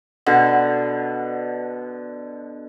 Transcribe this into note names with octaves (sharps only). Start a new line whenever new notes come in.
B2 D3